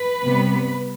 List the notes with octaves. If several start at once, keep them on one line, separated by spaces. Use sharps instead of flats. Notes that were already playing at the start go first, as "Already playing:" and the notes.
Already playing: B4
C3 G3 B3